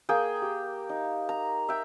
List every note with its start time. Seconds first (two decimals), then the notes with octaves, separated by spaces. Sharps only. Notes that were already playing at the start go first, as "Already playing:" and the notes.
0.09 A#3 G#4 G5
0.42 G4
0.89 D#4
1.29 A#5
1.69 E5 G5